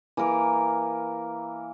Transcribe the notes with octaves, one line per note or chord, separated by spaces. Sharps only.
E3 A#3 A#4